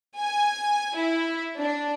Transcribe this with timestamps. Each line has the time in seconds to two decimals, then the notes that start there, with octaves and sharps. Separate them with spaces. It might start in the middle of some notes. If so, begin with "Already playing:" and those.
0.19 G#5
0.96 E4
1.58 D4